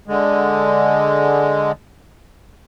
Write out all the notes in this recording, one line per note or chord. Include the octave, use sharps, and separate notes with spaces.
D3 G#3